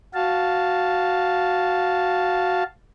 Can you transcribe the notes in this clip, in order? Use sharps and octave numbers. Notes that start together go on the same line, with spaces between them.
F#4 F5 A5